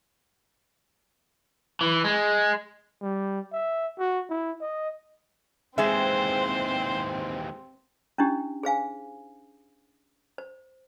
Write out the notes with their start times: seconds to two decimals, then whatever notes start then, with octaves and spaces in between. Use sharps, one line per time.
1.81 E3
2.04 G#3
3.02 G3
3.53 E5
3.99 F#4
4.30 E4
4.61 D#5
5.78 D#2 E3 G#3 C4 G#4 C5 E5
8.18 C#4 D4 E4 G4
8.63 G#4 C5 F5 G#5
10.38 C5